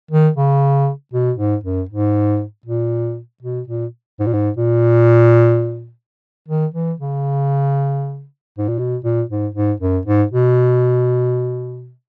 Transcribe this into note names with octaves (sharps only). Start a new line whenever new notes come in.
D#3
C#3
B2
G#2
F#2
G#2
A#2
B2
A#2
G#2
A#2
G#2
A#2
D#3
E3
C#3
G#2
A#2
B2
A#2
G#2
G#2
F#2
G#2
B2